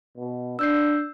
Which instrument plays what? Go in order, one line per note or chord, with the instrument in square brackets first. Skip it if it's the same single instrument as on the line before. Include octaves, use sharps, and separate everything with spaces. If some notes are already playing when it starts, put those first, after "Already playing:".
[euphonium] B2
[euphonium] D4 [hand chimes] E6 G6 C7